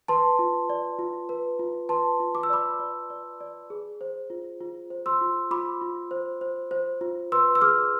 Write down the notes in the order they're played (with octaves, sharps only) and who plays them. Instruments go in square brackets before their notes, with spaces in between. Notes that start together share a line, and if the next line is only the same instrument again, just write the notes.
[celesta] B4 A5 C6
F4
D5
F4
B4
F4
B4 A5 C6
F4
D6
E6
D5 B5 D6
D5
D5
D5
G#4
C5
F4
F4
C5
C6 E6
F4
F4 B5 D6
F4
C5
C5
C5
F4
B4 C6 E6
E6
G#4 D6 F6